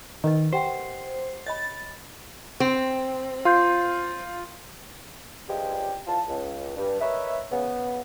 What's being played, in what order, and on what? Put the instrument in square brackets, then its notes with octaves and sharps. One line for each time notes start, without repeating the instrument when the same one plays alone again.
[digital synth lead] D#3 [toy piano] A#4 B4 D#5
[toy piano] G4 F#5 G5 [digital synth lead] C5
[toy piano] C#5 D#5 B5 [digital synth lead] A6
[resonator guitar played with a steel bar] C4
[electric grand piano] F4 [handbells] F5 C6 G6
[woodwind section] C#2 G2 F3 G3 G#3 G4
E2 F4 A5
C#2
G2
A#4 B4 C#5 D#5 E5
C#3 B3